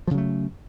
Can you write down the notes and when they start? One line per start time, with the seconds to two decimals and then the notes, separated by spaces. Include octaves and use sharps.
0.07 F3
0.11 C#3
0.14 F#3
0.18 A3